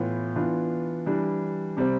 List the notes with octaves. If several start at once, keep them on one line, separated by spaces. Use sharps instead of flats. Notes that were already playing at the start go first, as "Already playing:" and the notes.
Already playing: A2 E3 B3 F4 B4
E3 B3 D4 F4
E3 G3 D4
C3 G3 C4